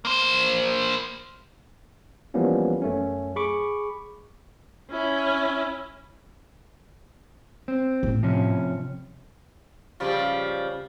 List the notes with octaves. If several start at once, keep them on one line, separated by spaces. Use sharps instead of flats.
A#3 C5
E3 F3 G3 A#3 B3 C#4
F#2 A3 C#4
G#4 B5 C#6 D6
C#4 E4
C4
A2
C3 F3 C#4
C#3 F3 G3